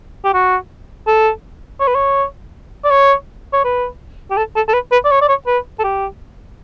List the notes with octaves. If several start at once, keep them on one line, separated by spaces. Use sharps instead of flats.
G4
F#4
A4
C#5
B4
C#5
D5
C#5
C#5
B4
G4
A4
A4
A4
B4
B4
D5
C#5
D5
C#5
B4
A4
G4